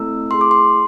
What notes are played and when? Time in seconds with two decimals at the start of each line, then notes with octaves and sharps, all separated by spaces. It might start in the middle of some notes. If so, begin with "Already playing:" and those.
Already playing: A3 C4 E4 A4 E6
0.31 A3 E4 G#4 C6
0.41 D6
0.51 C6